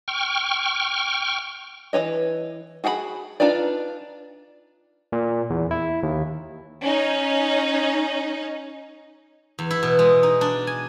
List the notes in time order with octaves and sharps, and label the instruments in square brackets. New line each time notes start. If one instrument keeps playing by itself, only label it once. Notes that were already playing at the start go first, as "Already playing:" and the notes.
[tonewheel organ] G5 C#6 F6
[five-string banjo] E3 B4 C#5 D#5
F#4 G#4 F#5 G5 B5
D4 D#4 F4 B4 D5
[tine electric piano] A#2
E2
E4
D#2
[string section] C#4 D#4
[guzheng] E2
E4
B2
G#3
D#4
D4
G#5